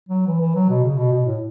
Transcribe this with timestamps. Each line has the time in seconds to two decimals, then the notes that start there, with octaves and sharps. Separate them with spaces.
0.09 F#3
0.27 E3
0.41 E3
0.55 F#3
0.69 B2
0.84 C#3
0.97 B2
1.12 B2
1.26 A2